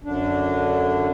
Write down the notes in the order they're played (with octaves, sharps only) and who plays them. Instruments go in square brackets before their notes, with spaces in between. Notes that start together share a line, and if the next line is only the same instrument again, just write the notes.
[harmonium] F#2 D3 D4